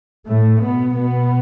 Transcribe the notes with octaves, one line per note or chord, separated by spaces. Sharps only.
A2 A3
B2 B3
B2 B3